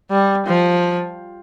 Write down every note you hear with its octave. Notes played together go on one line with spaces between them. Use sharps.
G3
F3